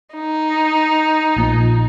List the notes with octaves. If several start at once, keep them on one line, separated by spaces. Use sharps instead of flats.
D#4
A#1 A#2 F3